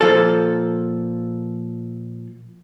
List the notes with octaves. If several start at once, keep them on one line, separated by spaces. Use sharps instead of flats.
A#2 F3 A4